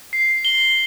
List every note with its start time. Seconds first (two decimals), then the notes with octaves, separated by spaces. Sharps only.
0.13 C7
0.45 G7